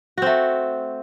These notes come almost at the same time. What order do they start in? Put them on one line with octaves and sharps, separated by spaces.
F#4 C4 A3